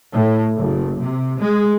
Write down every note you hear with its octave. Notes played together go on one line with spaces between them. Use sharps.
A2
F#1
C3
G#3